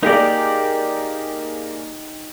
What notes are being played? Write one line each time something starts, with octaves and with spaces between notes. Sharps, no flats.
A#3 D#4 G4 G#4 A#4 D5